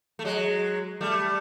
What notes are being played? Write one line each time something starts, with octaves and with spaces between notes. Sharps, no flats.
A3
F#3 G#3
G3 A3